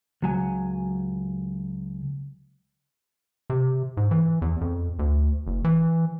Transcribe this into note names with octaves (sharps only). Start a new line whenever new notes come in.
C#2 F#3 G#5
C3
G#2
E3
E2
F2
D2
F#1
E3